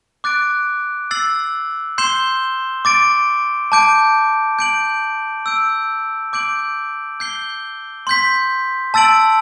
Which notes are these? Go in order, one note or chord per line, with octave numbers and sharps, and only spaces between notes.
D6 F#6 A6 D7
E6 A6 C7 F#7
C6 G6 C7 E7 G7
D6 A6 D7
A5 D6 G6 D7
G6 D7 F#7
E6 G6 D7
D6 G6 D7 F#7
G6 C7 G7
C6 G6 B6
A5 E6 A6 D7 F#7